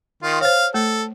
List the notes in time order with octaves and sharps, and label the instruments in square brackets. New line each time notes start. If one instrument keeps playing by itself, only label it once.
[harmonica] D#3 F4
[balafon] C5 C#5 [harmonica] F5
[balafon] A3 [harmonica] A4